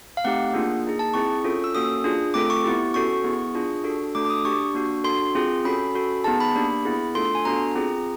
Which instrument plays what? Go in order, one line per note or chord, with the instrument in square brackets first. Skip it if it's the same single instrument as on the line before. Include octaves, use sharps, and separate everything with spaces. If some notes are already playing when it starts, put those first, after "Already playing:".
[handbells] F5
A3 C4 D#4 G4 F#5
A#3 D4 F4 G#4
A#3 D#4 G#4
A5
C4 E4 G#4 C#6
C#4 F4 A4
E6
A#3 C#4 F#4 A4 D#6
D4 F4 G#4
A3 C4 F4 A4 D6
C#6
B3 E4 G4
C#4 F#4 A4 C#6
B3 E4 G#4
D4 F4 G#4
D4 F#4 A4
A3 D4 F#4 A4 D6
D6
D#6
D4 G4 C#6
A#3 D4 F#4
D4 F#4 A4 C6
C4 F4 G#4
C#4 F#4 A4 B5
C#4 F#4 A4
B3 D#4 G#4 A5
B5
A#3 D4 G4
B3 E4 G#4
A3 D4 F4 A4 C6
C6
G#5
B3 D4 F#4 A4 A#5
C4 F4 G#4